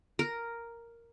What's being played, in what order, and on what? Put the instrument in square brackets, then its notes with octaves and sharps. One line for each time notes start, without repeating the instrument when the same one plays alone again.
[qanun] A#4